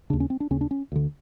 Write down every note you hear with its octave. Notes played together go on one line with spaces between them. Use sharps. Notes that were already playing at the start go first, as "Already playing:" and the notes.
D#2 C#3 D4
C#4
C4
D4
D#2 C#3 C#4
D4
C#4
D2 D3